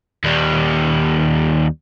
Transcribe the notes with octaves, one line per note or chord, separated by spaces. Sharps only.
D#2 G3